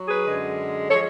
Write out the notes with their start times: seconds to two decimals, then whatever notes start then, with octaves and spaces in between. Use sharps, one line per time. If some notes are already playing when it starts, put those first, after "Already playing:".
Already playing: F#3
0.08 G#4 B4
0.25 F#2 D3 G#3
0.89 F3 G#3 A4 C#5